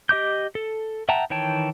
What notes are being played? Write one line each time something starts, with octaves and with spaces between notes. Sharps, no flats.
G4 D#5 D6 G6
A4
E5 F#5 G5 A5 A#5
D#3 E3 C#5 G5 A5